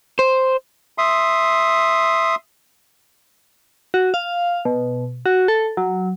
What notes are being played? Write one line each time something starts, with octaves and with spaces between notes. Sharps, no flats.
C5
E5 C6 D#6
F#4
F5
B2
F#4
A4
F#3